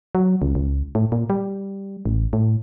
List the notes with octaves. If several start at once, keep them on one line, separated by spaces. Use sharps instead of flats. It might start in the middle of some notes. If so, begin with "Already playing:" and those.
F#3
C#2
C#2
A2
A#2
G3
A1
A2